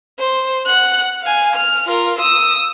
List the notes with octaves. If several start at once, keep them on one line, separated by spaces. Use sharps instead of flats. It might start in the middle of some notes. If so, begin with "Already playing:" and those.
C5
F#5 F#6
F5 G#5
F6
F4 A#4
D#6 E6